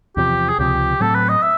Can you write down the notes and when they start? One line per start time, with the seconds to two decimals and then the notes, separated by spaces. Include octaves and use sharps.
0.17 E2 C3 F3 G4
0.49 G#4
0.58 C#2 C3 F3 G4
1.00 A2 F#3 A3 C4 A4
1.15 B4
1.29 D#5
1.42 E5